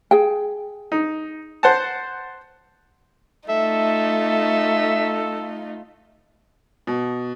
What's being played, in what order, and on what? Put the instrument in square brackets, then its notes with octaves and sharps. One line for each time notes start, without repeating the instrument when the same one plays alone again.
[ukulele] G#4 G5
[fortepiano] D#4
C5 F#5 A5
[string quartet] A3 D#4 F4 [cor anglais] A4 [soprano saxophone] E5
[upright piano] B2